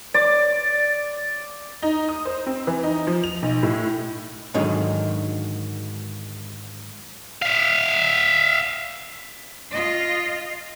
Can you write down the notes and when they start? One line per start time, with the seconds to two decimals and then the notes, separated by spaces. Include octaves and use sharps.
0.14 D5
1.82 D#4
2.09 D#6
2.25 C5
2.47 C4
2.67 E3
2.83 D#4
3.07 F3
3.24 F7
3.42 B1
3.63 A2
4.54 G#2 D3 D#3 F#3
7.42 E5 F5
9.71 F4 D#5